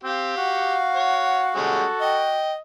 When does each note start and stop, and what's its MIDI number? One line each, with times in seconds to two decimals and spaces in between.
0.03 0.34 60
0.03 0.78 67
0.03 1.55 77
0.38 2.42 66
0.38 1.85 78
0.96 1.43 73
1.56 1.83 55
1.56 1.83 56
1.56 1.83 61
1.56 2.24 69
2.01 2.58 75
2.01 2.52 79